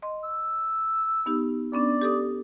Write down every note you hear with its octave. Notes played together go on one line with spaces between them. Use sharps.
D#5 C6
E6
B3 D#4 G4
B3 C#4 D4 D5
G4 A4 D#6